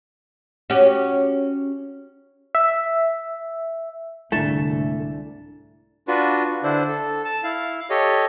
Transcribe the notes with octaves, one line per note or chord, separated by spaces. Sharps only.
C#4 F#4 G4
E5
C2 G#2 D3 A3 D4 E4 A5
D4 F4 F#4 B4
D3 D4 E4 C5
A4
A5
E4 F5
G4 A4 C#5 D#5